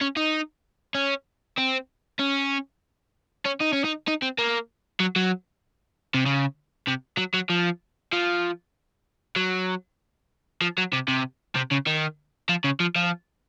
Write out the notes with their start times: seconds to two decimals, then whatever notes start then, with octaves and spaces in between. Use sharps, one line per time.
0.01 C#4
0.17 D#4
0.95 C#4
1.58 C4
2.20 C#4
3.45 C#4
3.60 D#4
3.73 C#4
3.84 D#4
4.08 D#4
4.22 C4
4.38 A#3
5.00 F#3
5.16 F#3
6.14 C3
6.26 C#3
6.88 C3
7.18 F#3
7.34 F#3
7.50 F3
8.13 F3
9.36 F#3
10.62 F3
10.78 F#3
10.93 C3
11.08 C3
11.55 C3
11.71 C#3
11.86 D#3
12.49 F3
12.64 C#3
12.80 F3
12.96 F3